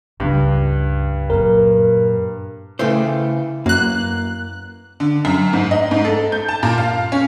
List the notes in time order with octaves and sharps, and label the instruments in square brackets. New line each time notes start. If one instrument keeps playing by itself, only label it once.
[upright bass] C#2 [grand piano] G2
[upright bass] F#2 A#2 [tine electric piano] A#4
[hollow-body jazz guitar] C#3 A3 C5 [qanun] E3 G5 D6
[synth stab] F#2 F#6 [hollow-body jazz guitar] A#3
[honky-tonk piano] D3
F#2
G#2
D#5
G#2
A4
G6
A5
A#2
F5
C#4